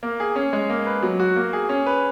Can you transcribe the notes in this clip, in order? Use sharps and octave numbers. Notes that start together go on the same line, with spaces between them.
A#3
G#4
C#4
G#3
A#3
B4
F#3
F#4
A#3
G#4
C#4
B4